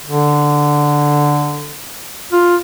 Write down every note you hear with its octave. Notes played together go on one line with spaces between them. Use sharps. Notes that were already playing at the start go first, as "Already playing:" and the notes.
D3
F4